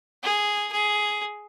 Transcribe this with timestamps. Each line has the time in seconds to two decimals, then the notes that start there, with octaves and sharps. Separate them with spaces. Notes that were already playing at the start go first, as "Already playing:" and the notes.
0.23 G#4
0.72 G#4